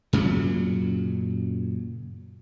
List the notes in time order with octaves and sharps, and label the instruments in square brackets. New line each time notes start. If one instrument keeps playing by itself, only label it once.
[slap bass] F#2 A#2 C#3 F#3